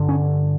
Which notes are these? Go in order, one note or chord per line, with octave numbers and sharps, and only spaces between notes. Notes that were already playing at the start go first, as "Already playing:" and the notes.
Already playing: G2 D3
C#4